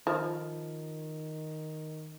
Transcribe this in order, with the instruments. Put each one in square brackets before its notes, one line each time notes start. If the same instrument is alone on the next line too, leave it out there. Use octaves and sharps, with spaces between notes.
[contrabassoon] D#3 [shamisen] F3